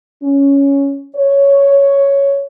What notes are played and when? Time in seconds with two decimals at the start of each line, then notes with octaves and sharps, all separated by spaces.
0.23 C#4
1.16 C#5